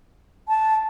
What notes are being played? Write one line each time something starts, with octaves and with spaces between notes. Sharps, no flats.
A5